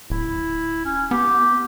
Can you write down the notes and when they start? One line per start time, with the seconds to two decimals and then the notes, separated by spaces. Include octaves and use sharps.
0.10 D1 E4
0.85 C#4
1.11 B3 G4